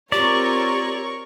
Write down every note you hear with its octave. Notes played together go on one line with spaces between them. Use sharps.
C4 F4 G4 A#4 C#5 D5 C#6